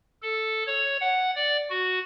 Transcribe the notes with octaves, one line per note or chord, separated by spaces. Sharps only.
A4
C#5
F#5
D5
F#4